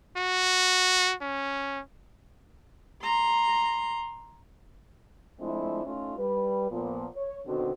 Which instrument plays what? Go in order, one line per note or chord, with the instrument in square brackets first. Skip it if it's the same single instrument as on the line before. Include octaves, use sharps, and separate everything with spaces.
[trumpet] F#4
C#4
[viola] A#5 C6
[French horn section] F3 G#3 A3 C4 D4 E4
A3 C#4 D#4 F4
G3 B4
A#2 F3 B3
C#5
B2 D3 D#3 C4 F#4